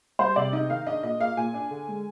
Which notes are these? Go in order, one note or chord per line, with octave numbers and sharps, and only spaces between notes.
G3 C5
C3 D5
D#4 D#5
D#3 F5
D4 D#5
A#2 D#5
A#3 F5
A#2 G#5
D4
D3
G#3